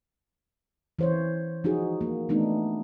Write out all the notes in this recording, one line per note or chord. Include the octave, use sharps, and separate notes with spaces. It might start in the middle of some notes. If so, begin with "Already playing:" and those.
E3 C5 C#5
F3 D#4 F#4 G#4
A#3
E3 A3 B3 D4 D#4